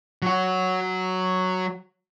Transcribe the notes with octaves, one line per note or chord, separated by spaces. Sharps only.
F#3 F#4